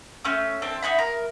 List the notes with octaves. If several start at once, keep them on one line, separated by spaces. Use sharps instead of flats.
A3 C#4 E6
C4 D4 A4
D#4 E5 F#5 B5
A#4